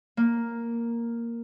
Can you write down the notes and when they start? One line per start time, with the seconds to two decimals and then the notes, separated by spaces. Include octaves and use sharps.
0.17 A#3